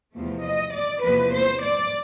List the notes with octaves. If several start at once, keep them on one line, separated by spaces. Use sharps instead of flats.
E2 C3 F3 A3
D#5
D5
E2 C3 F3 A#3 B4
C5
D5